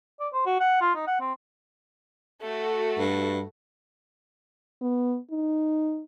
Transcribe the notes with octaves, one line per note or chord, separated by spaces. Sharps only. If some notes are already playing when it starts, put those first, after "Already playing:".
D5
C5
F#4
F#5
F4
D#4
F#5
C4
A3 F#4
G2
B3
D#4